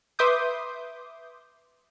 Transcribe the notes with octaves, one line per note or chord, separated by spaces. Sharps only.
B4 E5 C6 D6 D#6 G6